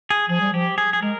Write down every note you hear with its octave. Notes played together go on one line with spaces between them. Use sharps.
G#4
F3 G#4
G3
F3 G4
G#4
G#4
G#3 A#4